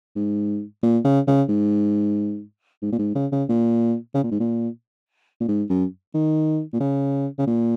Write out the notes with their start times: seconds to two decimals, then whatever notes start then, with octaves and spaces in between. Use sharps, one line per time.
0.16 G#2
0.83 A#2
1.05 C#3
1.27 C#3
1.49 G#2
2.82 G#2
2.93 A#2
2.99 G#2
3.15 C#3
3.32 C#3
3.49 A#2
4.15 C#3
4.24 A#2
4.32 G#2
4.40 A#2
5.41 A#2
5.48 G#2
5.70 F#2
6.14 D#3
6.73 A#2
6.80 C#3
7.39 C#3
7.47 A#2